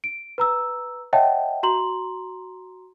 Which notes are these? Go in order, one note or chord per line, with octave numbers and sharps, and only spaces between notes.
D7
B4 A#5 E6
C#5 D#5 E5 F#5 G5 A5
F#4 A#5 C6 F#7